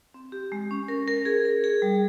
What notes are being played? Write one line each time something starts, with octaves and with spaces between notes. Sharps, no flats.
C4
G4
G#3
C#4
A#4
A#4
G#4
G#4
G#4
G3